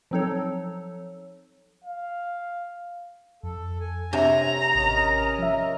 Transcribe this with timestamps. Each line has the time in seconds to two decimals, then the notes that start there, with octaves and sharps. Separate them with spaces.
0.11 F3 F#3 C4 D#4 A4 C#5
1.84 F5
3.43 F2 A4
3.80 G#5
4.13 C3 D4 C#5 E5 A#5
4.75 G#1 C#4 A#4 D#5
5.39 F3 E5